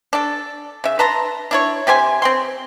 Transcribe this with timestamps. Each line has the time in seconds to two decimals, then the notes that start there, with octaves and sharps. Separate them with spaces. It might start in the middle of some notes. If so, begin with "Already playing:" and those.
0.13 D4 A4
0.84 C#3 E5
0.99 B4 A5 A#5 C6
1.51 D4 E4 C#5
1.87 C3 G4 C5 G#5
2.22 C4 G5 C6